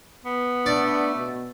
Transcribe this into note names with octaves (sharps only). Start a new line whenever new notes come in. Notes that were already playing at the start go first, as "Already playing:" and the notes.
B3
A3 D4 D5
B2